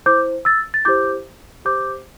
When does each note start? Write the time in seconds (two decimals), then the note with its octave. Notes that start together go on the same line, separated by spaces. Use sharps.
0.06 E4 C5 D6 G6
0.45 E6 A6
0.74 A6
0.85 E4 G4 C5 D6 G6
1.65 G4 C5 D6 G6